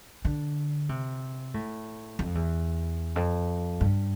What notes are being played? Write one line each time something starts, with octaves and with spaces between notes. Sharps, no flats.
D3
C3
A2
F2
E2
F2
G2